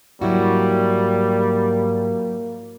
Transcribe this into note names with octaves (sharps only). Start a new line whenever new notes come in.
G#2 F#3 G3 A#3 E4 F#4